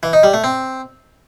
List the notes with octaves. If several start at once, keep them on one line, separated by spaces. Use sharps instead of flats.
E3
D#4
G3
A3
C4